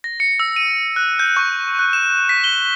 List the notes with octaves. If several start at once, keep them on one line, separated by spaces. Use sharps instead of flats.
A#6
C#7
E6
D#7
F#6
G6
C#6
F#6
E7
B6
G7